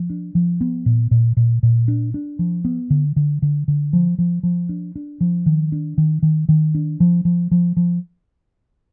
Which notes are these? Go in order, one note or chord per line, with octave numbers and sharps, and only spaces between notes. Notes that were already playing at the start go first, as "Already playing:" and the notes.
Already playing: F3
D4
F3
B3
A#2
A#2
A#2
A#2
D4
D4
F3
B3
D3
D3
D3
D3
F3
F3
F3
D4
D4
F3
D#3
D4
D#3
D#3
D#3
D4
F3
F3
F3
F3